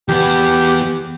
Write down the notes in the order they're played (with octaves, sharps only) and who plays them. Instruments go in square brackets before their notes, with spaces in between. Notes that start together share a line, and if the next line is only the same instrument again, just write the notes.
[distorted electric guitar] E2 B3 [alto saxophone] G4